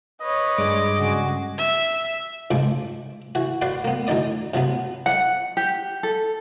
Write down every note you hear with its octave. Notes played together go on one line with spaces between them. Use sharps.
B4 C#5 D#5
G2 G#3 D5 D6
C#3 F#4 G#4
E5
C#2 G#2 F3 D6
E3 F#4
F4 F#4 B4 D5 C6
A#3 B3
D2 E3 D#4 D5 D#6
C3 F3 F#3 B3
F#5
G4
A4